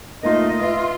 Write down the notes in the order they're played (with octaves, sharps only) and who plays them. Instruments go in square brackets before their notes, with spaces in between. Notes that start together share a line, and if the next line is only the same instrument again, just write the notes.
[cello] A3 D#5 [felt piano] A#3 D#4 F4
[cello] F4 [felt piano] B4 E5